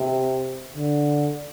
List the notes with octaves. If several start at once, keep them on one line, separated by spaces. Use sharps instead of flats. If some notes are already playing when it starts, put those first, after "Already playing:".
Already playing: C3
D3